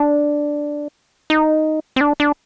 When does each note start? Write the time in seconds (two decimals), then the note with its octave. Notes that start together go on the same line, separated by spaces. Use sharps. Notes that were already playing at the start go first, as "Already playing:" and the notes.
Already playing: D4
1.30 D#4
1.96 C4
2.01 D4
2.20 D4